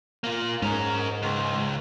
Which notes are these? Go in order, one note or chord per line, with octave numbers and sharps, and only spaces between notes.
A#3 F4
G#2 C#4 A#4
C#2